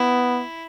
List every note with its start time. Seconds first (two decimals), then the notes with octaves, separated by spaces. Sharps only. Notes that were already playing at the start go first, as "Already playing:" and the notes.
Already playing: B3 E4